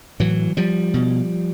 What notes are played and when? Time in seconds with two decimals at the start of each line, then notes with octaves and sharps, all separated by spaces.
0.20 A2 E3 F#3
0.57 F3 G3
0.94 B2